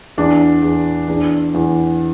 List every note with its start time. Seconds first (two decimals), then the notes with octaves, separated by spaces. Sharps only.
0.18 E2 D4
0.63 E2
1.08 E2 D4
1.54 E2